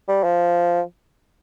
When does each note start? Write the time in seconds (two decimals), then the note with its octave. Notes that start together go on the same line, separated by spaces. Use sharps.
0.08 G3
0.24 F3